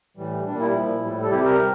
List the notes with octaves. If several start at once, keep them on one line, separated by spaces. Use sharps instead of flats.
A2 E3 G3
A#2 G3 D4
E4
A#2 F3
A2 G3
A4
C3 G3 E4 G4
G4 A#4
F3